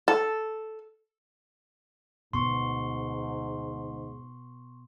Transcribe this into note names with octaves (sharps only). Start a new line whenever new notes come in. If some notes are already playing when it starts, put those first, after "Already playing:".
A4
D2 G#2 B2 B3 C6 C#6